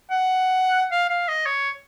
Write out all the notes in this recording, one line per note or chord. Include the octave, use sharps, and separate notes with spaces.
F#5
F5
F5
D#5
C#5